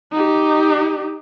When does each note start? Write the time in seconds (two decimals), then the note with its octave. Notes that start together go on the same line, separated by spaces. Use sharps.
0.12 D#4 G4